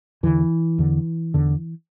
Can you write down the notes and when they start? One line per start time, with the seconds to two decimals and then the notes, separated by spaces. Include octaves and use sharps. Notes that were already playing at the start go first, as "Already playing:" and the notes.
0.23 E2 D3 E3
0.78 E2 D3
1.34 E2 D3